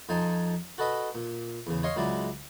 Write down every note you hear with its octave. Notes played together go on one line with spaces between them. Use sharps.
F2 F3 D#4 G#5 A5
F#4 A4 B4 D#5 B5
A#2
E2 C#3
C#5 D#5 F5 C6 C#6
C#2 F#3 G#3 E4 D5